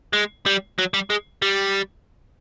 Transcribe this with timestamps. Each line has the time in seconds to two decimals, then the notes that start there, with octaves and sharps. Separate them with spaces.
0.13 G#3
0.46 G3
0.79 F#3
0.94 G3
1.10 G#3
1.42 G3